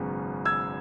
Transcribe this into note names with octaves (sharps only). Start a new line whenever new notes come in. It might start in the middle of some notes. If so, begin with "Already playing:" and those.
Already playing: G#1 F#2 C#3 B3
E6 G#6